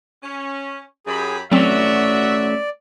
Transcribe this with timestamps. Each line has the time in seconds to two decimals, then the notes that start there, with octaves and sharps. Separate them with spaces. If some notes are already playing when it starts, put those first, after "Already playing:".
0.23 C#4
1.06 F#2 G4 G#4 B5
1.52 F#3 A3 C4 C#4 F#4 D5 E5